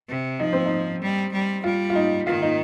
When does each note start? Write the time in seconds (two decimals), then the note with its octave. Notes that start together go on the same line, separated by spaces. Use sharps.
0.08 C3
0.39 F3 D#4
0.53 C4
0.66 D#4
1.02 G3
1.33 G3
1.64 G3 F4
1.90 F4
1.95 D#4
2.26 D#3 F4
2.42 D#4